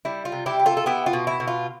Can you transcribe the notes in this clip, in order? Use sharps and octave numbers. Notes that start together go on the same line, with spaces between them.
G3 E4
F4
C3
E4 G4
E4
F4 A4
A4
B3 E4 G4
F4
B2
E4
B2
F4